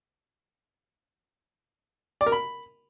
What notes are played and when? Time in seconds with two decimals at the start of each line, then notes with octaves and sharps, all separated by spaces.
2.21 D5
2.26 A#4
2.32 B5